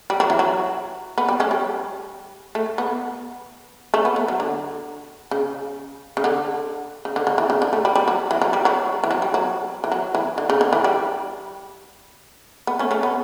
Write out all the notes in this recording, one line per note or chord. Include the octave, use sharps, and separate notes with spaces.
G3
F#3
E3
F#3
B3
G3
A3 C#4
G3
A3
B3
A3 C#4
B3
A3
F#3
D3
C#3
C#3
D3
C#3
D3
D3
E3
C#3
D3
A3
G3
G3
F#3
E3
F#3
G3
F#3
E3
F#3
G3
F#3
E3
F#3
E3
D3
C#3
D3
E3
G3
B3
A3 C#4
A3 C#4
B3